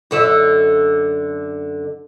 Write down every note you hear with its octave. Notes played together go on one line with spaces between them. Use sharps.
F#2 D3 E5